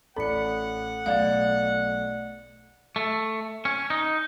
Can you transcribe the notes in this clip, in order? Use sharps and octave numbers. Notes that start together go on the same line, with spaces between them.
A1 A4 D5 F#5 B5 C#7
B1 A3 A4 D5 F5 A6
A3
C#4
D#4